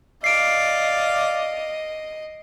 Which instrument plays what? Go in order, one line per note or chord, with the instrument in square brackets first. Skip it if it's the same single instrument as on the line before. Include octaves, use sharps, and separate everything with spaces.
[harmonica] D5 F5 [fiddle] D#5 [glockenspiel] C7 D7